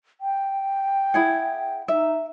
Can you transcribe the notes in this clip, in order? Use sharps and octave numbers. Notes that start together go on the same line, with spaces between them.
G5
E4 G#4 F#5
D#4 E5